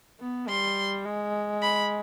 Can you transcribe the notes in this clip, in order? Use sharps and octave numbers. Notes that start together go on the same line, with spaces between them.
B3
G3 C6
G#3
B5